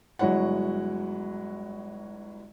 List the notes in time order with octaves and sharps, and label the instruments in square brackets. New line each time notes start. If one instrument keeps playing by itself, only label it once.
[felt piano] G1 F#3 G#3 E4 C#5 F#5